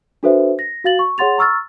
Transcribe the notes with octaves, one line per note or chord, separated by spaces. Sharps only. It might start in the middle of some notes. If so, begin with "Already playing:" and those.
D4 F#4 A4 B4 C5 E5
A#6
F#4 F5 A6 F#7
C#6
G#4 C#5 F#5 C6 A6 F7
A#5 C#6 E6 F6 A6